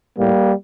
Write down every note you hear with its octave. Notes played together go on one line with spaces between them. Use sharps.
A2 G3 A#3